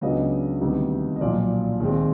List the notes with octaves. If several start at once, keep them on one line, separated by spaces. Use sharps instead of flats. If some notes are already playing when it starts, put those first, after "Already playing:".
C#2 C#3 F#3 B3 D4 D#5
D2 C3 D#3 G3 B3
D#5
B1 A#2 F3 D5
D#2 D#3 G#3 C4